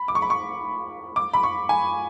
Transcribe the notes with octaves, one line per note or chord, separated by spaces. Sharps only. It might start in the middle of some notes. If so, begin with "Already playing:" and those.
Already playing: B5
D6
C#6
B5
C#6
D6
B5
C#6
G#5